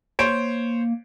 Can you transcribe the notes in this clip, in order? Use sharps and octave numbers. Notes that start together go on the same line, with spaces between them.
A#3 C5 C#5 D7